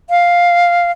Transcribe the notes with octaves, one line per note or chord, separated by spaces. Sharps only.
F5